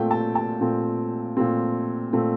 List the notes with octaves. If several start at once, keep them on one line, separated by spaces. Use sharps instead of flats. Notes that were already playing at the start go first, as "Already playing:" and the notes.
Already playing: A#2 A3 C4 G5
A5
A5
A#2 A3 C4
A#2 A3 C4
A#2 A3 C4